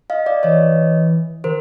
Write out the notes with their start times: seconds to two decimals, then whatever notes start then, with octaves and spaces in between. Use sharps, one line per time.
0.10 D#5 F5
0.26 D5 E5
0.43 E3 C#5 D#5
1.44 D#3 A#4 C5